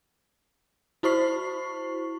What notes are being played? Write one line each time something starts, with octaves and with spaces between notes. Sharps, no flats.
E4 F#4 C5 C#6 C7